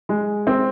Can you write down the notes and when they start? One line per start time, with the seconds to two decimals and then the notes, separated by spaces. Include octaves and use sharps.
0.09 G#3
0.47 C4